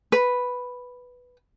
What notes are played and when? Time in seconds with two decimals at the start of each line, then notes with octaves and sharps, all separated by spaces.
0.12 B4